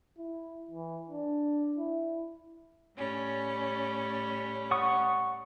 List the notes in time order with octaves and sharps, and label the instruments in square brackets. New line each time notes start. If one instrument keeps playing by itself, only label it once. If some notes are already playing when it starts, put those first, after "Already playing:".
[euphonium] E4
E3
D4
E4
[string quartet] A2 G3 C#4
[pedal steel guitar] F#5 C#6 D#6